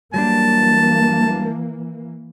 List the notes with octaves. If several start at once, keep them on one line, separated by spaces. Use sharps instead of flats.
E3 F#3 G3 A#3 D4 A5